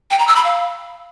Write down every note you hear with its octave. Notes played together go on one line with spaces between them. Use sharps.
G5
A#5
E6
B5
F5